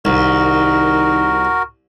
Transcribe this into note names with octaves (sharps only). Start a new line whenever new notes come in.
C2 D#3 F#4 A#4